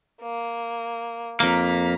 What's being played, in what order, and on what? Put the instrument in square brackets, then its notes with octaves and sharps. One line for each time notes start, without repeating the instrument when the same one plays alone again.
[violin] A#3
[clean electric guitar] F2 A#3 [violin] A#5 B6